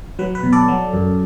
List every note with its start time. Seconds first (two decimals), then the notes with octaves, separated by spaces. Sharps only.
0.19 F#3 B4
0.35 B4
0.43 B2
0.53 A4 D5
0.68 F#3
0.93 F#2